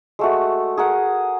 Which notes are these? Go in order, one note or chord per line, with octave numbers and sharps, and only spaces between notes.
G#3 A3 F#4
G#4 A#4 F#5